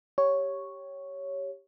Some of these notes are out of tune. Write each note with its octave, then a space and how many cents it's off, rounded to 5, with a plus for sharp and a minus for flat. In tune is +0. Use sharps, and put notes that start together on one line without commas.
G4 +0 C#5 +0